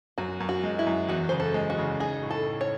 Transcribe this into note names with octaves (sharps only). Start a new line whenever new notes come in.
F#2 F#4
F#2
F#4
G#3
E4
F#2
E2 F#4
C#3 C5
A4
G#3
F#4
C#3
D#4 G#4
A2
A4
A2
C#5